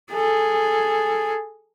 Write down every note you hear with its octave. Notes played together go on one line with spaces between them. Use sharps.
G#4 A4